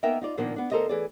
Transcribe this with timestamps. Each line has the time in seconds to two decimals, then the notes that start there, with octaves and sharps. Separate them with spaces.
0.03 A#3 B3 D#4 A#4 E5 G5
0.21 D#4 F4 D5
0.37 A#2 D#3 F3 A#3 B3 D4
0.56 B3 D4
0.71 D2 A4 A#4 C5 D#5
0.89 E3 G#4 D5